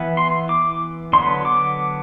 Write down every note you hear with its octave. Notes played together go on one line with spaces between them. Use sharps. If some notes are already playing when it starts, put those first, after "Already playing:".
Already playing: E3 B3
C6
D6
D3 F#3 B3 C6
D6